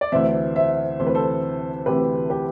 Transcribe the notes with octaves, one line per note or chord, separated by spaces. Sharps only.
D5
D2 C3 E3 C5 E5
C5 E5
D2 C3 E3 C5
B4
A4 C5
D2 C3 E3 G4 B4
G4 B4